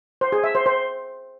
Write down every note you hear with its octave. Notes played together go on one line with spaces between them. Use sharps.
C5
G#4
E5
C5
C5